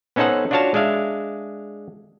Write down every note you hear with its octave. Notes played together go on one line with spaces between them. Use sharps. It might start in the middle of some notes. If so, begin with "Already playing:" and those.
B3 C#4 D#4 A4 C5 F#5
D4 F4 F#4 C#5 F5 A5
G#3 D4 E5 F5